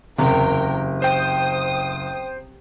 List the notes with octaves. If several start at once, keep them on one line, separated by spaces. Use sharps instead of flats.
F#1 E2 C3 A#4 G5
C5 G5 D#6